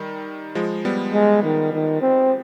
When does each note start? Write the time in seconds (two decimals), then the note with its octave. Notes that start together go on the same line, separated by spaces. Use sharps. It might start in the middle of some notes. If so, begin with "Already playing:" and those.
Already playing: D#3 G3
0.55 F3 G#3
0.85 G3 B3
1.14 G#3
1.44 D#3
1.74 D#3
2.02 C4